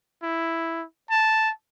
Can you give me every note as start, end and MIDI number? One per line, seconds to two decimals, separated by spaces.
0.23 0.84 64
1.10 1.51 81